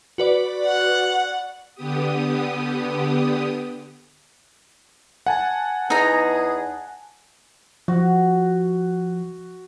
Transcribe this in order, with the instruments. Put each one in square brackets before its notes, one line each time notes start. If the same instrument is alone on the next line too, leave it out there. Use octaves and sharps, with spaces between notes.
[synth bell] F#4 B4 D5
[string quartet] F#5
[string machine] D3 B3 G4 D#6
[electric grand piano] F#5 G#5 A5
[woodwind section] E2 G#4 [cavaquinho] D#4 A#5
[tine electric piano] F3 [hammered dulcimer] F#4